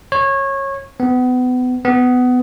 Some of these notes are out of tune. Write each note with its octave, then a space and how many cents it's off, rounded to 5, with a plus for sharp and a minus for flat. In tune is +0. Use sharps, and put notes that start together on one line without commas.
C#5 -20
B3 +30
B3 +20